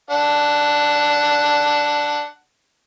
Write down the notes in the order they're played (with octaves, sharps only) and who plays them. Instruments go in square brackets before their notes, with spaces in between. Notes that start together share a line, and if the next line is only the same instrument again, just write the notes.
[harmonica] D4 F#5